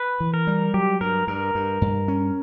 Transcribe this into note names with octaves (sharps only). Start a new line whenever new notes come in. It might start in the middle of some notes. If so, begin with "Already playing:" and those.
Already playing: B4
E3
A#4
G3
F#3 G4
G2 A#4
G2 A#4
G2
G2
C#4